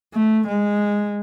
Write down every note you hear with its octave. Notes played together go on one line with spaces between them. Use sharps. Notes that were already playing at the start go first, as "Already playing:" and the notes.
A3
G#3